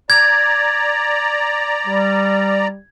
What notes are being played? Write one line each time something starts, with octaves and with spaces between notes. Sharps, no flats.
D5 A#5 G#6
G3